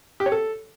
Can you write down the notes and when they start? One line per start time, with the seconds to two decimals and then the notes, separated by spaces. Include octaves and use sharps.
0.20 G4
0.26 C#5
0.32 A4